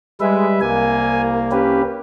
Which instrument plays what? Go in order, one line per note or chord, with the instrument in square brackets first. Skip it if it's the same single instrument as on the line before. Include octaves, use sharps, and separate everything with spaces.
[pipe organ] G3 B4 E5 [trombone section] G#3
[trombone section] C2 A#3 [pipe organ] G#5
[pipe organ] C#4 G4 B4